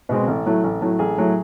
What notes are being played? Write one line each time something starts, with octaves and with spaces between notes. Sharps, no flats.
B2 G#3 C4
A1
A2 F#3 A3
A1
A2 F#3 A3
A1 G#4
A2 F#3 A3